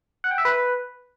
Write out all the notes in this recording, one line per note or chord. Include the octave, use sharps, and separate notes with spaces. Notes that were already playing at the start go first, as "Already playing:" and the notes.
F#5
G5
E5
B4